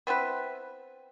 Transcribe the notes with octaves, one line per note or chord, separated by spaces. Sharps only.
B3 C4 E4 B4